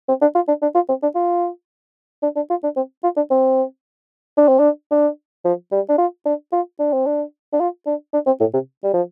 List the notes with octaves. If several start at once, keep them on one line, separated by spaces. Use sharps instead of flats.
C4
D4
F4
D4
D4
F4
C4
D4
F4
D4
D4
F4
D4
C4
F4
D4
C4
D4
C4
D4
D4
F3
G3
D4
F4
D4
F4
D4
C4
D4
D4
F4
D4
D4
C4
A2
C3
G3
F3